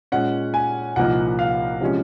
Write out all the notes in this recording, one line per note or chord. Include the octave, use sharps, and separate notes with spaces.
A#2 G#3 C#4 F#5
G#5
C2 A#2 F3 A#3 D#4 F#5
F5
C3 F3 G#3 C#4